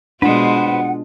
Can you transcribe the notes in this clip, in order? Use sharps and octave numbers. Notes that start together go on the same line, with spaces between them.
B2 G#3 D4 F4 B4 C5 F#5